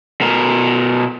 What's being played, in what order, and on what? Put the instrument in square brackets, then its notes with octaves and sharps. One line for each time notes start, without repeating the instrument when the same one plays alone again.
[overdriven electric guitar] B2 A#4